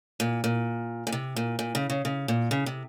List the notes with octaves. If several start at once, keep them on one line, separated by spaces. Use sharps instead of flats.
A#2
A#2
A#2
C3
A#2
A#2
C#3
C#3
C#3
A#2
C#3
C3